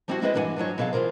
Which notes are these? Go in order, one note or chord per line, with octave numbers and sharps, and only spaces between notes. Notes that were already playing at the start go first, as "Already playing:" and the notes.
F3 G3 C4 D#4 E4 F#4
G#3 C4 E4 G#4 B4 D#5
G2 E3 D4 A4 F#5 G#5
G2 F3 F#3 C#5
B2 F#3 G#4 A4 E5 F5
E3 F4 G#4 A#4 C5